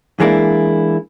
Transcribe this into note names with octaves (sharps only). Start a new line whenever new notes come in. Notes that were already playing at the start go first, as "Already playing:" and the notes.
E3 G#3 A#3 D4 E4